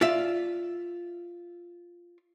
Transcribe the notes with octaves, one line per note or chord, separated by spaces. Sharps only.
F4 D5 E5